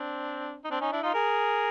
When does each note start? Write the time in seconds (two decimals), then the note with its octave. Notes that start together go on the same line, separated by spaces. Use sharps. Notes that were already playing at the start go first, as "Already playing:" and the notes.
Already playing: C4 D4
0.65 D#4
0.71 C4 D4
0.81 C#4 D#4
0.92 D4 E4
1.03 D#4 F4
1.14 G#4 A#4